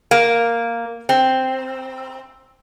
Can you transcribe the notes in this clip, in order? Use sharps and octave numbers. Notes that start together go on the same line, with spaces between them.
A#3
C4